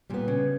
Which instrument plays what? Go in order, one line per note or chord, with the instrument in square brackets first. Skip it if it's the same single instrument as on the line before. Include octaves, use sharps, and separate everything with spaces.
[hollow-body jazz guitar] A#2 [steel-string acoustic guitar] G3 B3
[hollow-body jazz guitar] C#3